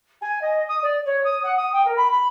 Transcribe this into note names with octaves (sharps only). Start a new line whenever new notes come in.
G#5
D#5
D#6
D5
C#5
D#6
F#5
D#6
G5
A#4
B5
B5